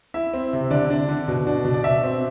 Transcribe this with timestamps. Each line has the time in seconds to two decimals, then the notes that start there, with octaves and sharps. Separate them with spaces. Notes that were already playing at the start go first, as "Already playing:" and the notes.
0.14 E4 E5
0.34 C4
0.53 C3
0.71 D3 D5
0.90 D4
1.09 D3
1.28 B2
1.47 D4
1.65 B2
1.74 D5
1.84 B2 E5
2.03 C4